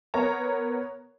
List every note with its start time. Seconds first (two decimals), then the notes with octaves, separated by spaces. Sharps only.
0.14 B3 A#4 C#5 A#5